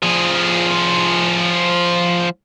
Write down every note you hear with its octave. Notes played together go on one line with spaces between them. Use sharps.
F3 G#4